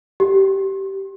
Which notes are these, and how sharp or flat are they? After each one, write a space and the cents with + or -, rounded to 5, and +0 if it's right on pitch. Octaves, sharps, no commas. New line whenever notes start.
G4 -20